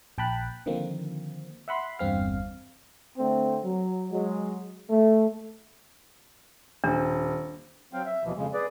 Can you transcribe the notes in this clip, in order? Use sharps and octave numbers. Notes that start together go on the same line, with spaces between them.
A#1 G5 A5 B5 F#6
D3 D#3 F3 A#3 C4
E5 F#5 B5 C6
G1 E2 G2 C4 F5
D3 A3 C4
F#3
F#3 G#3
A3
D#1 D4
F#3 C4 F5 G5
E5
D#2 B2 E3 F3
F2 C#3 G#3
G#4 B4 D5